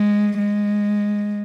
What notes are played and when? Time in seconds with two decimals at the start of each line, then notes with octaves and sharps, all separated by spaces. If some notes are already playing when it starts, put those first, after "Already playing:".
Already playing: G#3
0.38 G#3